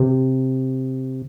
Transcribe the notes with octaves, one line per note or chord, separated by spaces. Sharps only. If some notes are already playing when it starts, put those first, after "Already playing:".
Already playing: C3